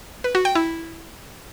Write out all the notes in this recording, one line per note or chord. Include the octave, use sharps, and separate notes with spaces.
B4
F#4
G5
E4